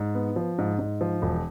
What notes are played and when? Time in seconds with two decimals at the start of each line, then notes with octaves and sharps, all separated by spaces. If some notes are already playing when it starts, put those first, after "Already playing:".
Already playing: G#2
0.15 B3
0.36 F3
0.58 G#2
0.79 G#2
1.01 F3
1.22 E1